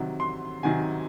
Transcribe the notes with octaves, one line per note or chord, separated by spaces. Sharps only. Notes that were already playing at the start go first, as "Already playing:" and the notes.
Already playing: C3 D#3 F#3
C6
C3 D#3 F#3 G#5